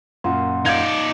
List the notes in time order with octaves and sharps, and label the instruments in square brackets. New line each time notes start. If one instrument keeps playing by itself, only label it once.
[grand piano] F#2 A#2 [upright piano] F4 [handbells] F#5 C6
[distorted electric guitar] D#4 D5 [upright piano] F5 G6 G#6